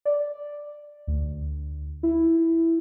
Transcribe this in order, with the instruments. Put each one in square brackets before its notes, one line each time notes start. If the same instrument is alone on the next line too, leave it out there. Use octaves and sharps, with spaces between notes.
[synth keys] D5
D2
E4